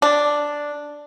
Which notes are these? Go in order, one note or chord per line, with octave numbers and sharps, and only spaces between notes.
D4